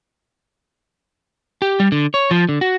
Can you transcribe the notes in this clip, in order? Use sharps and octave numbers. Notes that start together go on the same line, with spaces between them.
G4
G3
D3
C#5
F3
D3
F#4